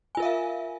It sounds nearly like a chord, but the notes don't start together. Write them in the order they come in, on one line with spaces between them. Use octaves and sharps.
G#5 F4 A#4 E5 F5